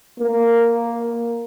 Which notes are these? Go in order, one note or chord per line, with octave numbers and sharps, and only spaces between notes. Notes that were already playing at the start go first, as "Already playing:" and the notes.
A#3